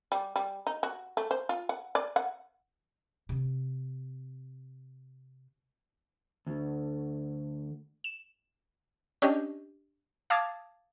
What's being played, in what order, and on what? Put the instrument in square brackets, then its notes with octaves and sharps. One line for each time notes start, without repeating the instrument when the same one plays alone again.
[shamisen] G3
G3
D#4
F#4
A3
C5
F4
F#5
D5
F#5
[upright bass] C3 C4
[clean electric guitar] D2
[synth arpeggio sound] E7
C#4 D4 G4 D#5
F5 A5 D6 D#6 G#6 A6